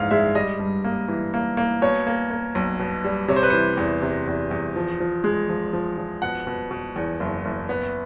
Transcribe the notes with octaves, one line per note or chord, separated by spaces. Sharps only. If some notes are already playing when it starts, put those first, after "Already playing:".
Already playing: A#1 G#2 E3 F5
G#3 E5
G3 D#5
G2
A#3
E3
A#3
A#3
B2 C#5
A#3
A#3
B1
B2
G3
C3 C#5
C5
B4
E3 C5
E2
C3
E2
E2
F3
F3
G#3
F3
F3
F3
B2 F#5
B2
B2
E2
F#1
F#1
B3